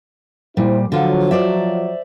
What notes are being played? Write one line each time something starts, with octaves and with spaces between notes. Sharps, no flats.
A#2 G3 E4 C5
D3 F3 F#3 F4 F#5
C5 D5 E5